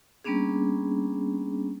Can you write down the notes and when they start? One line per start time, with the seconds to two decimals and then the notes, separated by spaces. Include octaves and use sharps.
0.24 G3 A#3 B3 C#4 D4 G#4